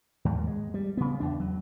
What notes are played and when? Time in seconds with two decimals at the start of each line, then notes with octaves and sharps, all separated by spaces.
0.25 D#2 G#2
0.47 G#3
0.74 G3
0.97 C#3 B3
1.20 E2 D4
1.40 F#3